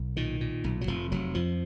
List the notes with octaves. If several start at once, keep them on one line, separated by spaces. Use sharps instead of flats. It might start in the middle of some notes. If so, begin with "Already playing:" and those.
Already playing: B1
A#2 D#3
A#2
B1
F#3
F1 F3
F1 F#3
F2 F3